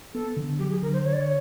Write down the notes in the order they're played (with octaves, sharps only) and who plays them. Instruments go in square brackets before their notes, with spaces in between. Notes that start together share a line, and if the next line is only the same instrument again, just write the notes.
[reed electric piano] B3 [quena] A4
[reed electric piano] D3
[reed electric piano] F#3 [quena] G4
[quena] G#4
[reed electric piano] D3 [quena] A#4
[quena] C5
[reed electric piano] D3 [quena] C#5
[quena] D5
C#5